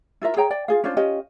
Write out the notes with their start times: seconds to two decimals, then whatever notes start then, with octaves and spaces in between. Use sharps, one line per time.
0.22 E4 F4 A#4 E5
0.37 G#4 C#5 G5 A#5
0.50 D5 G5
0.68 F4 G#4 F5
0.84 C#4 D4 F4 C5
0.97 C#4 F4 G4 D#5